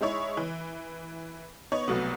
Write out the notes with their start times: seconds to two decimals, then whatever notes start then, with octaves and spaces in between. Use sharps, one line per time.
0.01 G#3 D#4 E4 C#5
0.37 E3
1.72 B3 D#4 C#5
1.88 C2 B2 F#3 A3 B3